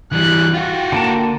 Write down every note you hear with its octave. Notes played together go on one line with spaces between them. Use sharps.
E3 G3 F#6
F4 F#4 G5
D3 A#3 A5